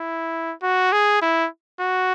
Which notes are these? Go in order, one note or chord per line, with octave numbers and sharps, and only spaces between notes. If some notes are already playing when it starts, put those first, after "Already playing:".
Already playing: E4
F#4
G#4
E4
F#4